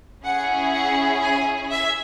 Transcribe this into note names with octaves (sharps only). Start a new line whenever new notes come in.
C#4 E4 G#4 F#5
F#5
G#5
E5